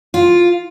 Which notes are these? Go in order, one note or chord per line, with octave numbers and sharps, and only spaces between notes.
F4